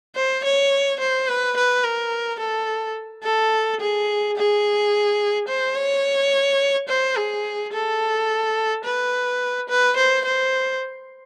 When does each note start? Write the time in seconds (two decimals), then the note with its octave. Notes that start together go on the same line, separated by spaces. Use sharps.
0.16 C5
0.45 C#5
1.00 C5
1.28 B4
1.57 B4
1.84 A#4
2.40 A4
3.24 A4
3.80 G#4
4.37 G#4
5.48 C5
5.76 C#5
6.89 C5
7.16 G#4
7.73 A4
8.85 B4
9.69 B4
9.97 C5
10.25 C5